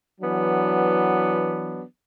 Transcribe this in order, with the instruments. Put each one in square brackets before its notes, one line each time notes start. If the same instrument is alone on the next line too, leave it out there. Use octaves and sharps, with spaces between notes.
[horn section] E3 F#3 B3 D4